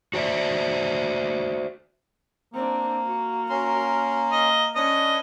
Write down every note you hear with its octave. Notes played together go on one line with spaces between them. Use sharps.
F#4 C5 D5 E5
A#3 C4 D4
F#4
C#4 A#4 C6
D#5
C#4 D4 B4 D#5